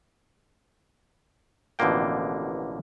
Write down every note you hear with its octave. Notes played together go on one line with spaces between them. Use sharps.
A1 B2 D3 F3 A#3 G5